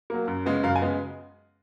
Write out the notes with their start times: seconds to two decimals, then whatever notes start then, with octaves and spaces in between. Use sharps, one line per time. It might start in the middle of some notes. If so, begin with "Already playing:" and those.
0.10 F#3 A#3
0.28 F#2
0.46 C#3 G#3 B3
0.63 F#2 F5
0.76 G#5
0.81 C#3 G#3 B3